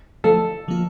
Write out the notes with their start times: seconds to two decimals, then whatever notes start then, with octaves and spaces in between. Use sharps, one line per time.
0.24 D3 F3 A3 A4
0.68 D3 F3 A#3 F4